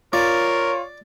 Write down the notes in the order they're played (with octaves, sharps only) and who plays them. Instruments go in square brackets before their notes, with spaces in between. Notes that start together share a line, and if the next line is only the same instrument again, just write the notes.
[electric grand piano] F4 [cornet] A#4 [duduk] C#5 [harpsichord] D5